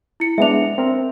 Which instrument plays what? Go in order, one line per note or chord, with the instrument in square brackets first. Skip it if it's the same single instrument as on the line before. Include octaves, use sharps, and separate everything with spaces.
[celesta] E4 C#7
[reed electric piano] G#3 B3 D4 [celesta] E5 F7
[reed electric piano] C4 A#4